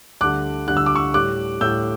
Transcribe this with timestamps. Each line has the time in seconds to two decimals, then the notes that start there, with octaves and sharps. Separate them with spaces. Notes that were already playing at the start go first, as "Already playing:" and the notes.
0.21 D2 D3 G3 D6 F#6
0.68 D2 D3 G3 F#6
0.77 E6
0.86 D6
0.95 C#6 E6
1.14 A2 G3 D6 F#6
1.61 A2 G3 E6 G6